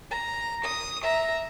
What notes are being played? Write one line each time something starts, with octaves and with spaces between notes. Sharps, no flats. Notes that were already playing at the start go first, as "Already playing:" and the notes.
A#5
D#6
E5 A#5